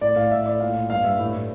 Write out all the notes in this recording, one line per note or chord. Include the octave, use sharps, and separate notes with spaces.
A2 D5
A2 F5
A2 E5
A2 D5
A#2 F5
A#2
G2 F5
G2 E5
A2
A2